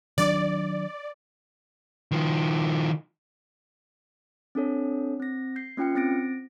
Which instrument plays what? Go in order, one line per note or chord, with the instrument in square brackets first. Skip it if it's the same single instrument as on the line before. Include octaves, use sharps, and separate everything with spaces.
[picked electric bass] D#3 F#3 D4 [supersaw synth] D5
[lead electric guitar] D#3 F3
[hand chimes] C4 D4 A4 C#5
C4 A#6
G6 C7
A#3 C#4 F4 G5 F6 C#7
C4 A6 A#6 D7